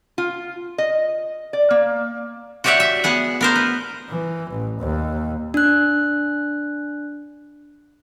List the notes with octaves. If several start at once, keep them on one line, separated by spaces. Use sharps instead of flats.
F4
D#5
D5
A#3
F#4 G4 C#5 D5 E5 F#5
E5
B3 G#4 F#5
B3 A#4 C5
B4
E3
A1
D#2
D4 F#6